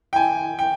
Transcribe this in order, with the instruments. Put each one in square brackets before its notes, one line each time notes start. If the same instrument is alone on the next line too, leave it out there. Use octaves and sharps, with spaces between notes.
[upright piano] G5
G#5
G5